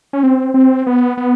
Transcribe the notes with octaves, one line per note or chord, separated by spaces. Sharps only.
C#4
C4
C4
B3
B3